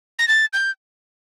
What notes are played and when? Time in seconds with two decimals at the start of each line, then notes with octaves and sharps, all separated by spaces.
0.19 A#6
0.28 A6
0.53 G6